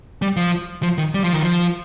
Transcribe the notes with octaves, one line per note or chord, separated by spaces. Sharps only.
G3
F3
F3
D#3
G3
F3
D#3
F3